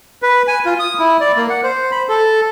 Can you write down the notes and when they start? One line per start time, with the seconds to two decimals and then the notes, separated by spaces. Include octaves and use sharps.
0.22 B4
0.47 G#5
0.66 F4
0.80 D#6
0.99 E4
1.20 D5
1.37 A#3
1.49 F#5
1.64 C5
1.92 B5
2.09 A4